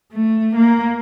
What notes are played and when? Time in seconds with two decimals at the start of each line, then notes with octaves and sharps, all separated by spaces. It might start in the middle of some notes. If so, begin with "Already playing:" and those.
0.12 A3
0.56 A#3